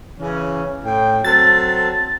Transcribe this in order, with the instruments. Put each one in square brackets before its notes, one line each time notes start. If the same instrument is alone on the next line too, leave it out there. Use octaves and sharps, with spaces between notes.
[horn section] C#3 E3 C#4
A2 G5
[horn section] F#3 C4 A4 [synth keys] A6